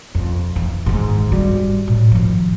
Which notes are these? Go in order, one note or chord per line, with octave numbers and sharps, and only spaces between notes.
F2
E3
G#2 D#3
F#2 G3
A2
D#3 F3